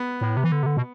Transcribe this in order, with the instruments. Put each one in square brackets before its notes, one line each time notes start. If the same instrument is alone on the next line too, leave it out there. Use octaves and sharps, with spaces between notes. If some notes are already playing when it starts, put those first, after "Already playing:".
Already playing: [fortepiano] B3
[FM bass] A2
C3
E3
D3
C3
D3
B2